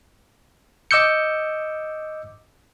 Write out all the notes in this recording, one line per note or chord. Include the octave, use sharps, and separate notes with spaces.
D#5 D6 E6 G6 C#7